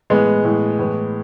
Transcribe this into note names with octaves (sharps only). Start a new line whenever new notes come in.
A2 E3 G#3 B3
A2 E3
A2 E3